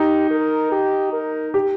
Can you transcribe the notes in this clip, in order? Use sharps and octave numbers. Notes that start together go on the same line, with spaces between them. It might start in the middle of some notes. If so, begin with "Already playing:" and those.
Already playing: D#4 G4
A#4
G4
A#4
G4